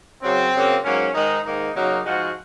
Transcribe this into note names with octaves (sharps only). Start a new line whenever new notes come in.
F#2 C#3 F#3 C4
F#2 C#3 F#3 A#3
G#2 F#3 A#3 C#4
G#2 D#3 G#3 D#4
G#2 D#3 A#3 D#4
F#2 C#3 F#3 A#3 D#4
G#2 F3 G#3 F#4